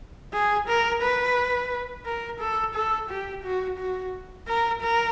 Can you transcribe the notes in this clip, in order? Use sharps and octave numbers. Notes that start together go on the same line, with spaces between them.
G#4
A#4
B4
A#4
A4
A4
G4
F#4
F#4
A#4
A#4